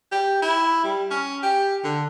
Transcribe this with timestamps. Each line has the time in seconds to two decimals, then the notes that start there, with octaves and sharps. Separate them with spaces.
0.12 G4
0.42 E4
0.84 G3
1.11 C#4
1.43 G4
1.84 D3